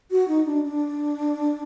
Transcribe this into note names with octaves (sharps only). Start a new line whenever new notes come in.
F#4
D#4
D4
D4